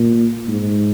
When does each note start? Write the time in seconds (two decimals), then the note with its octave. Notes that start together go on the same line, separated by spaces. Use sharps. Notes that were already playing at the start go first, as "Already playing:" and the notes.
Already playing: A#2
0.48 G#2